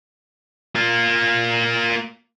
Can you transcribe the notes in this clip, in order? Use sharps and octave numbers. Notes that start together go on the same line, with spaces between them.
A#3 F4